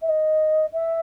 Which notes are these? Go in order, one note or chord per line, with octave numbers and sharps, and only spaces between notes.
E5
D#5
E5